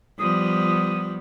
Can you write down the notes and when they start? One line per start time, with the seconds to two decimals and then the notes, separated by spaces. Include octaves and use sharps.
0.19 F3 G3 B3 D#6